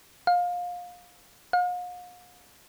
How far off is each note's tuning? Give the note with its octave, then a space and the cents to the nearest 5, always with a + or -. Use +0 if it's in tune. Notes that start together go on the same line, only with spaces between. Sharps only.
F5 +25
F5 +45